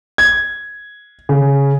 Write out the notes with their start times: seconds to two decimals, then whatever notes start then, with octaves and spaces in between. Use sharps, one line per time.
0.18 G#6
1.29 C#3